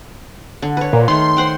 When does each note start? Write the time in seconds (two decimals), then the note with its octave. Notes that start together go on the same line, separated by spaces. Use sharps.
0.62 D3
0.77 B4 C#5
0.93 A#2
1.08 D#3 A3 C6
1.37 C5 F#5 G5